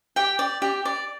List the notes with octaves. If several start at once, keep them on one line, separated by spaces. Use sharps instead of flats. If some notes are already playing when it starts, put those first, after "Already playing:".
G4 G5
D5
G4
D5